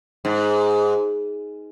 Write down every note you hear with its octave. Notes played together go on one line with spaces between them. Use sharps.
G#2